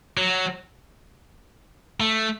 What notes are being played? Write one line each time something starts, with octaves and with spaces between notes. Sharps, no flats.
F#3
A3